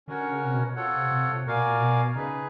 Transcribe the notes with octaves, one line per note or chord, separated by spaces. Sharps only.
D3 C#4 F#4 A#4 C#5 F#5
C#3
C3
B2
C3 F4 A4 C#5 F#5
C3
C3
C3
A#2 F#4 A#4 D5 F5 G#5
B2
A#2
B2
C#3 D#4 G#4 B4